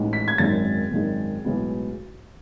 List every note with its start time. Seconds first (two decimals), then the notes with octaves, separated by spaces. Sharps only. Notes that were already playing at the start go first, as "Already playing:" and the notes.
Already playing: A1 A2 G#3 D#4
0.13 B6
0.28 G#6
0.38 G#1 F#2 D#3 G#3 A6
0.92 G#1 F#2 D#3 G#3
1.44 B1 A2 G#3 B3